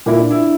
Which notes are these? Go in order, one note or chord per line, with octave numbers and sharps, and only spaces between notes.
A#2 A#3 E4 A#4
D4
E4